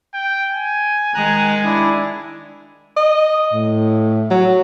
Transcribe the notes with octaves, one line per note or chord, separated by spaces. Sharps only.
G5
G#5
D#3 G#3 A#5 F#6
D4 E4
D#5
A2
F#3